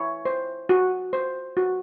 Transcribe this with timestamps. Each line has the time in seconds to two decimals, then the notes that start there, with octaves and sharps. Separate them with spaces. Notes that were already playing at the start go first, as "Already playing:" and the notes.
Already playing: E4 C#5
0.25 C5
0.69 F#4
1.13 C5
1.57 F#4